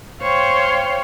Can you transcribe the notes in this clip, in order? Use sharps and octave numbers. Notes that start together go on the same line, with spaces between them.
C5 C#5 F5 G5 C6